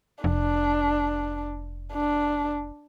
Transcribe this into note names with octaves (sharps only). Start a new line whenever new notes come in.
F1 D4
D4